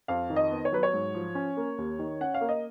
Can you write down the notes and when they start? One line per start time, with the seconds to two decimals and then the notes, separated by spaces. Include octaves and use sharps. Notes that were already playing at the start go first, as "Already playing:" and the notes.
0.08 F2 F5
0.30 D#3
0.36 D#5
0.51 B3
0.65 C#5
0.72 F#3 B4
0.83 C#5
0.93 G#2
1.14 F3
1.35 C#4
1.57 A#3
1.78 D#2
1.99 D#3
2.21 C#4 F#5
2.34 F5
2.41 A#3
2.49 D#5